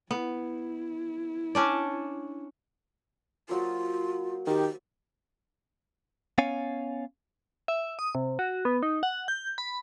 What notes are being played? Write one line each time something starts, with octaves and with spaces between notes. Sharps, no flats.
B3 E4
C#4 D4 D5
F#3 A#3 F4 C5
D#3 G4
B3 C#4 C#5 F5 G#5
E5
D#6
C3
F#4
B3
D#4
F#5
G6
B5